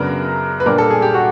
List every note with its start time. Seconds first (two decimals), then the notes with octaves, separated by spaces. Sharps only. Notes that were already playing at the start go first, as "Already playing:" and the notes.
Already playing: F#2 C#3 F#3 B3 D4 A#4 B4
0.60 B4
0.66 A#2 G3 A#3 D4 A#4
0.78 A4
0.91 G#4
1.02 G4
1.14 F#4